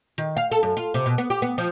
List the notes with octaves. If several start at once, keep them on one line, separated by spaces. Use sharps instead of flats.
D#3
F5
A4
F#2
F4
C3
B2
B3
G4
B3
F3